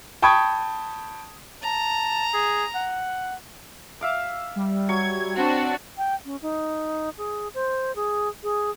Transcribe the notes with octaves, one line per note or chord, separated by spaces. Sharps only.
G5 A5 B5 C#6 D#6 G#6
A5 A#5
G#4
F#5
E5 F5 D6
G3
F#3 C#6 G#6
C4 D4 F#4 D5
G5
C#4
D#4
G#4
C5
G#4
G#4